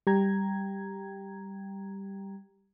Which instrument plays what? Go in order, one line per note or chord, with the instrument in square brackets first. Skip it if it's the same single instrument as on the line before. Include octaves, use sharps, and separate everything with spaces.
[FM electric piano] G3 G4 G5 A#5 G#6